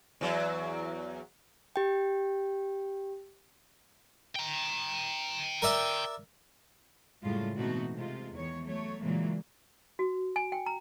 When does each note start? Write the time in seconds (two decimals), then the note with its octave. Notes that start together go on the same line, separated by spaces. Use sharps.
0.21 E2 F#3
1.76 G4 G5
4.36 G5 A#5
5.62 A#4 D5 E5
7.22 F#2 A2 C#3 G3 G#3 F4
7.55 B2 E3 A3 C4 D#4 F#4
7.93 C3 G#3 F4
8.33 E2 D#3 C#5
8.64 F#3 A3 C#5
9.01 A#2 C#3 E3 F#3 G#3 A#3
9.99 F#4
10.36 G#5
10.52 G5
10.66 A#5